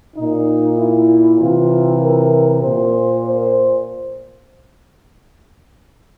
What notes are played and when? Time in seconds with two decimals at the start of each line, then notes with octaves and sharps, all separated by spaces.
0.16 A#2 D#4
0.78 E4
1.39 C3 E3 F4
2.01 A#4
2.62 A#2 C5
3.25 C5